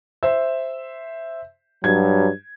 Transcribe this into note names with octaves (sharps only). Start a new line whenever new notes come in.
C5 E5
G2 F#3 G#6